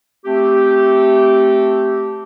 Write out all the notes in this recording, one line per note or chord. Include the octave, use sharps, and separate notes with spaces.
A3 C4 G4